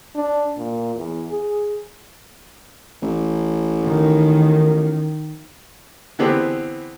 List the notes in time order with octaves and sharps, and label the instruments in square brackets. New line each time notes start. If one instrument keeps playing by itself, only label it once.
[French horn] D4
A#2
E2
G#4
[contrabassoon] A1
[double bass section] D#3
[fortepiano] D3 E3 B3 C4 G4 G#4